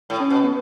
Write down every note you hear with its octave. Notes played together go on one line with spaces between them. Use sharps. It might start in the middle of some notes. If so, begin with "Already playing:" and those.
A2
C#4
B2
B3